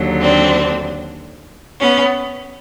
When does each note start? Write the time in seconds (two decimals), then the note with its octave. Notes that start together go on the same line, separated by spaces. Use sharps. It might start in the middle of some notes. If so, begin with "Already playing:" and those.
Already playing: D#2 D3 F#3
0.21 C4 D4
1.81 B3 C#4